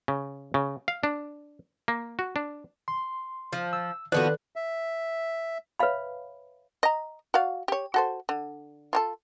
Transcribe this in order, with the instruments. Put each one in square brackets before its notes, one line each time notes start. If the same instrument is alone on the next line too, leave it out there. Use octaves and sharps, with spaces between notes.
[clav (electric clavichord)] C#3
C#3
F5
D4
A#3
F#4
D4
[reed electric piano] C6
[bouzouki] F3
[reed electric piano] E6
[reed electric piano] D#3 D5 F#6 [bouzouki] F3 B3 F#4 [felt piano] A4 B4
[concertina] E5
[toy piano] B4 C#5 E5 F5 B5
[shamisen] D#5 A#5
F#4 D5 F5
G4 C#5
F#4 A4 C5
D3
F4 G4 A4